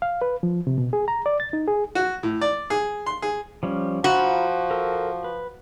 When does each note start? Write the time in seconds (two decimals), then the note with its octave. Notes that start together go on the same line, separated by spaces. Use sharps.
0.02 F5
0.22 B4
0.43 F3
0.67 C3
0.78 B2
0.93 G#4
1.08 A#5
1.26 D5
1.40 A6
1.53 D#4
1.68 G#4
1.95 F#4
2.23 A2
2.41 D5
2.70 G#4
3.06 C6
3.22 G#4
3.63 F3 G3 C#4
4.04 F3 F4 F#4 A#5 B5
4.71 A4 A#4
5.24 B4